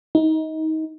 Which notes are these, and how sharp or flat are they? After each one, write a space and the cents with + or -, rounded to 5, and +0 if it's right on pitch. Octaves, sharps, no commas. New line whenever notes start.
D#4 +25